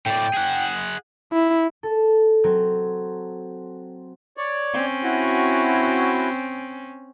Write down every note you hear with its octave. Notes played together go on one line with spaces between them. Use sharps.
A2 D5 G5
G#4 F#5
E4
A4
F#3 C4
C#5 D5
C4 C#4
E4 F#4